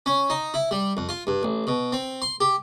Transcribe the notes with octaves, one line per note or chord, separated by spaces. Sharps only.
C#4
D#4
E4
G3
F2
F4
G2
A1
B2
C4
C6
G4